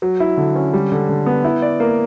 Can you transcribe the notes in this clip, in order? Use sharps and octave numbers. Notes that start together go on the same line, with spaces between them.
F#3
E4
D3
C#4
G3
D3
D3
B3
E4
D5
A#3